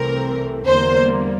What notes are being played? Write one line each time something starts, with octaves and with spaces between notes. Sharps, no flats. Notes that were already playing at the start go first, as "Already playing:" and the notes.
Already playing: C2 C3 E3 A3 C4 A#4
E2 D3 G3 A#3 C5